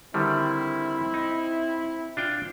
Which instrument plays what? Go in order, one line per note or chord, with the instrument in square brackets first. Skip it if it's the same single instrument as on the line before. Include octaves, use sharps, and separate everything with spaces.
[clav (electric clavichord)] D3 D#3 G3 [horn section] C4 E4
[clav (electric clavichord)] D#4
D4 F4 G5